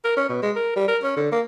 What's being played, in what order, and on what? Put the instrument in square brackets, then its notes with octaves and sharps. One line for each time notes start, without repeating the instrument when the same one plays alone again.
[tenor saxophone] A#4
C#4
B2
G#3
A#4
G3
A#4
C#4
D3
A#3